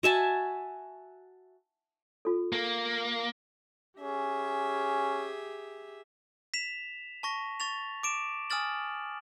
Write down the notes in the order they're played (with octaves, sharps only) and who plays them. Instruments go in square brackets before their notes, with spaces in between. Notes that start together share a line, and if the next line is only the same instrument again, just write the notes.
[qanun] F#4 E5 G#5 A5
[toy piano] F4 A4
[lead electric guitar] A#3
[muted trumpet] C#4 [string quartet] G4 G#4 E5
[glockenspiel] B6 E7 F7
A5 C#6 A#6
C#6 A6 F7
D6 D7 E7
G#5 D#6 F6 A6 F#7